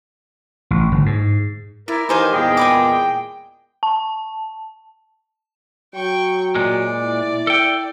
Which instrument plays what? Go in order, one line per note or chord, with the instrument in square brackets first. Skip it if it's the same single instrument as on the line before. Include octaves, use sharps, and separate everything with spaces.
[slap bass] A1
G1
G#2
[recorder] E4 [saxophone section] A#4 [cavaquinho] D5
[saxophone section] D#3 E3 G4 [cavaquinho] D#4 C5 F5 [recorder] G#5
[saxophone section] E2 A#2 [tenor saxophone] G#3 [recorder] G5
[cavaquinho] G#5 B5 D6
[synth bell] A5
[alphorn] F#3 [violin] G5 C#6
[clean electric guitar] A#2 G#3 [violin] D5
[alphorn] E4
[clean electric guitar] A4 G5